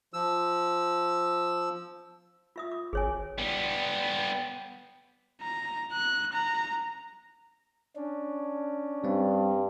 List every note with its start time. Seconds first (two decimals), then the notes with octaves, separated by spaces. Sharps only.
0.13 F3 E6
2.56 F4 E5 D#6
2.71 D6
2.93 G#1 G#4 C#5 G#5
3.38 G3 B3
5.41 A#5
5.92 F#6
6.33 A#5
7.96 C#4 D4
9.04 G2 G3 C4